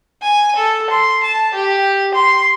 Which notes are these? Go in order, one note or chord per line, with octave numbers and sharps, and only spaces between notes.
G#5
A4
C6
A5
G4
C6